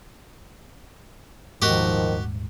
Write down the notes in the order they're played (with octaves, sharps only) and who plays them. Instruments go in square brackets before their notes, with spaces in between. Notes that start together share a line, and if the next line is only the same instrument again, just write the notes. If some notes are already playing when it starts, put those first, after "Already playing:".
[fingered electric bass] D#1 G#2 [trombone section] D#3 [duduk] F3 [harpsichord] F#4 G4